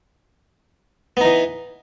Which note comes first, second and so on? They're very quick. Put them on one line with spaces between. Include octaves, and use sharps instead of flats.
B3 D#4 E3